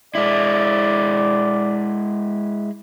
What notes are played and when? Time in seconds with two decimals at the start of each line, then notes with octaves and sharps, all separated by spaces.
0.15 G#3 E4 D5